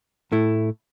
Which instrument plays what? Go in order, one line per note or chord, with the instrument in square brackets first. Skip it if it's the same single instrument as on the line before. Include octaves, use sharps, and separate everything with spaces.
[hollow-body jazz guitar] A2 A3 E4